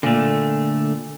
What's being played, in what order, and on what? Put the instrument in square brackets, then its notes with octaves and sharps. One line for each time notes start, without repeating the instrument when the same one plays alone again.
[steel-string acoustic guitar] A#2 [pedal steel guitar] D3 A3